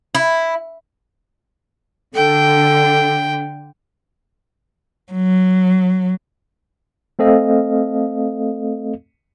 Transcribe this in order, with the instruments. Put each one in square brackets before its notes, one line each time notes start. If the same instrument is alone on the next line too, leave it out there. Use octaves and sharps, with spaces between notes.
[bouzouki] E4
[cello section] D3 [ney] A4 [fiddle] G5
[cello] F#3
[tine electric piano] A3 C4 A4 D#5 F5